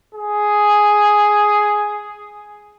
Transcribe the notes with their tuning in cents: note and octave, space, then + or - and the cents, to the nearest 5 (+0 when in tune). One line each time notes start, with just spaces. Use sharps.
G#4 +5